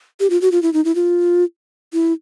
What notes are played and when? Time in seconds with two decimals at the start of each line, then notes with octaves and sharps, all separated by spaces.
0.20 G4
0.30 F4
0.42 F#4
0.52 F4
0.63 E4
0.74 D#4
0.85 E4
0.95 F4
1.93 E4